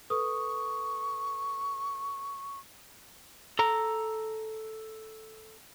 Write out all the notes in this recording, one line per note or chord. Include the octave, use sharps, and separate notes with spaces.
A4 B4 C#6 D#6
A4 A#5